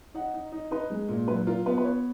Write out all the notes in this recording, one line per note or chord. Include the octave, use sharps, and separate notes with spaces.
D#4 F#5
D#4
D#4
D#4 B4
G#3
A#2
F#3 B4
F4 A#4
B3 B4
B4
B3 C#5